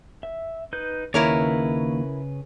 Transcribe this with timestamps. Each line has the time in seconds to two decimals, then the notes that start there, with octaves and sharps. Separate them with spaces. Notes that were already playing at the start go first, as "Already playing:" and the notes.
0.23 E5
0.73 D#4 B4 G6
1.14 D#2 C#3 E4 A#4 B4 C#5